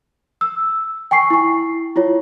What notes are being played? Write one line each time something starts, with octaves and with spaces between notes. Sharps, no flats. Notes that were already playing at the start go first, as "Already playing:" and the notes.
E6
G5 G#5 C#6 C7
E4 C#6
E4 F4 C#5